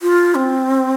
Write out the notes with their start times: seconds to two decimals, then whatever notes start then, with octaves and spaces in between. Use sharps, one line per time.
0.02 F4
0.35 C4